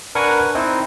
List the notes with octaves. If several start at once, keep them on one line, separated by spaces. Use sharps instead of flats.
D4 A#4 B4 F#5 G#5 C#6
C4 D#4 E4